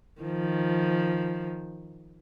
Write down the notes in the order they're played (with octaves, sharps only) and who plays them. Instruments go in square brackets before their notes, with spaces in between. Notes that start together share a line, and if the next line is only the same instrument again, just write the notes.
[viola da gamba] D#3 F3